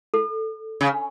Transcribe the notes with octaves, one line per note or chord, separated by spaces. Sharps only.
A4
C#3